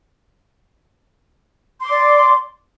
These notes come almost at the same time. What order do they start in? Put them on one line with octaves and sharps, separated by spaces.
C6 D6 D5